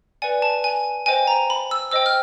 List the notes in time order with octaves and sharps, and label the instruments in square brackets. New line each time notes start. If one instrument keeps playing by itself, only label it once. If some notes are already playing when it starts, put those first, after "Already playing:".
[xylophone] B4 D5 F#5 G#5
A5
G#5
C5 D#5 G5 G#5
A#5
B5
E6
C5 D#5 G5 E6
F6